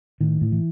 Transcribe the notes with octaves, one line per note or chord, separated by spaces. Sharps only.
A2 D#3
A2
E3